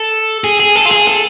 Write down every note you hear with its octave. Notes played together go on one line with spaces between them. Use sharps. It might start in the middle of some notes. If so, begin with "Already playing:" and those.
Already playing: A4
G#4
G#4
A4
F4
G#4
A4